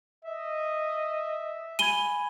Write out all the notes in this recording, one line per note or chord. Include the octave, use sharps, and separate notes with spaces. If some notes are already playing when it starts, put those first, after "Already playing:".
D#5 E5
G#5 B5 G#6 D#7 G7